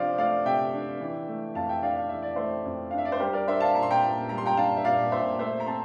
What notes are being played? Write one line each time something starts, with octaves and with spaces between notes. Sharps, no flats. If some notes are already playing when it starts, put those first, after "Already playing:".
Already playing: C3 F3 D4 C5 D5 F5
A3 D5 F5
C3 E5 G5
D4
E3
A3
F2 F5 A5
E5 G5
D4 D5 F5
F5
E3 E5
D5
A3 C5 E5
F2
D4 F5
E5
D5
C5
G3 G4 A#4
A#4 D5
D4 C5 E5
F5 A5
A#2 A#5
C6
G5 A#5
A#2
G3 A#5
C6
G5 A#5
D4 F5 A5
E5
A#2 D5 F5
A#2 C5 E5
A3 C5 E5
A#5
C4 A5 C6